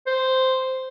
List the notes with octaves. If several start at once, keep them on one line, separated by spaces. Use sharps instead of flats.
C5